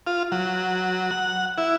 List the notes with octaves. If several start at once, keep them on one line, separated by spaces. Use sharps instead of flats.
F4
F#3
F#5
E4